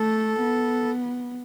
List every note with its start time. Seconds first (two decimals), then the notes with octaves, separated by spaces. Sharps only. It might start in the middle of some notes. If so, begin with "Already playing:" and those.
Already playing: A3 A4
0.40 B3